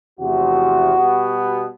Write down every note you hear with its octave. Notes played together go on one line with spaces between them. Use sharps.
E2 C3 F3 A3 F#4
B2 G3 B3